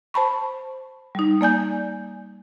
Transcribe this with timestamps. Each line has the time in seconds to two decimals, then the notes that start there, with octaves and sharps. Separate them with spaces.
0.14 C5 A5 B5 C#6
1.15 G3 D#4
1.41 A#3 D5 G#5 G6